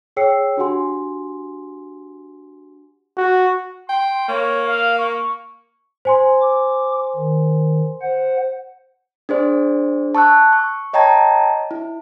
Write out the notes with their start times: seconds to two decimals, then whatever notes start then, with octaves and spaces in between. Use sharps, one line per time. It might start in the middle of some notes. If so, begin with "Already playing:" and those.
0.17 G#4 C#5 G5 E6 C7 C#7
0.57 D4 F#4 G4 F#5 G#5 C6
3.17 F#4
3.89 G5 C6
4.28 A#3 C#5
4.66 F5
4.98 C#6
6.05 C5 G#5 C6
6.41 D6
7.16 D#3
8.02 C5 F#5
9.29 D4 G#4 C5 D5
10.15 A5 C#6 E6 F#6
10.53 C#6
10.93 C#5 D#5 G5 A5 A#5 G#6
11.71 E4